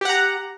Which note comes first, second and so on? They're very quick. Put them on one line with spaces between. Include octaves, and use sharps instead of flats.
G4 F#5 A#5